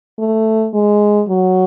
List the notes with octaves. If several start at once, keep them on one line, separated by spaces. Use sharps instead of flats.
A3
G#3
F#3